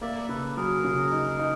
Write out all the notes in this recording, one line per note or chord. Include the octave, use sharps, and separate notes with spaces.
A#3 D5 E5
C#3 A4 B4
F#3 G#4 A#4
C#3
D#4
D#4